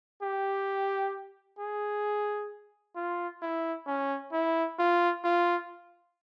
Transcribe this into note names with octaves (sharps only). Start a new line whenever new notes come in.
G4
G#4
F4
E4
C#4
E4
F4
F4